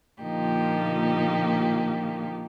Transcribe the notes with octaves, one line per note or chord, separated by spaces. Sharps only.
A#2 D3 F3 A#3 D#4 G4